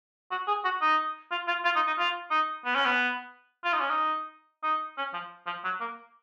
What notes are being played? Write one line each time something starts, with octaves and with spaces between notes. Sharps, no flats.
F#4
G#4
F#4
D#4
F4
F4
F4
D#4
D#4
F4
D#4
B3
C#4
B3
F4
D#4
C#4
D#4
D#4
C#4
F3
F3
F#3
A#3